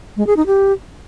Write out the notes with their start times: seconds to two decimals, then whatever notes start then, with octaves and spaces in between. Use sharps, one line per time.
0.17 G#3
0.27 G#4
0.36 D#4
0.46 G4